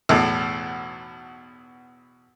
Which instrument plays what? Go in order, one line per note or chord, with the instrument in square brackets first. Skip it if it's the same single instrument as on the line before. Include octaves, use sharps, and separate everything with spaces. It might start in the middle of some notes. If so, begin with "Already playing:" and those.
[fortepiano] B1 E2 A2